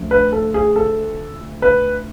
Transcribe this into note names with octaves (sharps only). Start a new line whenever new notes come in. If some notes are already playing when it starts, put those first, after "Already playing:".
Already playing: D2 F3
B4
A4
G#4
A4
B4